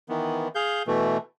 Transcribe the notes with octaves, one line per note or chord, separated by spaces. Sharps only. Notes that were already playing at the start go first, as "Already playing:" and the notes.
D#3 E3 B3
G#4 F5 G6
B2 E3 A3